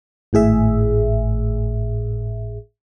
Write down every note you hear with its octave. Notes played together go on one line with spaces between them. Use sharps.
G#1 A2 G#4 E5